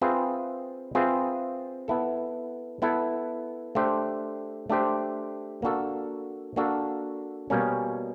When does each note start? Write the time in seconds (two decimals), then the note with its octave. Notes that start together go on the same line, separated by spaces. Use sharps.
0.01 C4 F4 G#4 B4 E5
0.95 C4 F4 G#4 B4 E5
1.88 B3 E4 A4
2.82 B3 E4 A4
3.75 A3 D4 G4 C5
4.70 A3 D4 G4 C5
5.62 A#3 D4 F#4 A4
6.56 A#3 D4 F#4 A4
7.50 B2 G3 A#3 C#4